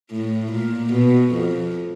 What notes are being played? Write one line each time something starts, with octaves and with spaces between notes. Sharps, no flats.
A2
A#2
B2
F2